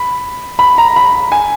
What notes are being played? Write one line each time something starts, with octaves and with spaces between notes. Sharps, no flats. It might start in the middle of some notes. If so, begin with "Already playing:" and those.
Already playing: B5
B5
A#5
B5
G#5